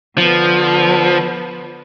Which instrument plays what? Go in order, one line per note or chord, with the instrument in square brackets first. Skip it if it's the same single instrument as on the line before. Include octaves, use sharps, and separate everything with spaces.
[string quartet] D3 B3 [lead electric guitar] F3